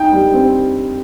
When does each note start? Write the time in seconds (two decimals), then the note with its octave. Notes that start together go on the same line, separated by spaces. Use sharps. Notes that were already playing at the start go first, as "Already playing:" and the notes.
Already playing: D#4 G5
0.12 G3
0.33 C4